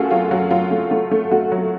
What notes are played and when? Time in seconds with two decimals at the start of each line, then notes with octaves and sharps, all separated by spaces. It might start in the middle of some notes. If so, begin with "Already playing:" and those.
Already playing: F#2 A3 F4 F#4 G#4
0.11 F#3 F4
0.31 F#3 F#4
0.51 F#3 F4
0.71 A3
0.91 A3 F4
1.11 A3
1.31 A3 F#4
1.52 F#3